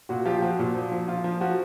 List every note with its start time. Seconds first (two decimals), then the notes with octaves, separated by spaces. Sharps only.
0.09 A#2 F#4
0.25 F3 F4 G4
0.42 F3 F#4
0.59 A#2
0.75 F3
0.92 F3
1.08 F3 F4
1.24 F3
1.41 F3 F#4